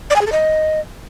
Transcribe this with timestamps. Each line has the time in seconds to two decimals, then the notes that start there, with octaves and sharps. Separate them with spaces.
0.10 D5
0.16 G#5
0.21 G#4
0.27 A4
0.32 D#5